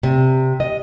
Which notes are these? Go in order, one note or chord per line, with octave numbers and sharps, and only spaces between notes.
C3
D#5